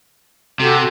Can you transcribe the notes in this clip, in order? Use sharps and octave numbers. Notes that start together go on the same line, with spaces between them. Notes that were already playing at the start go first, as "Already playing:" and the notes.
C3 F#4 G4 A4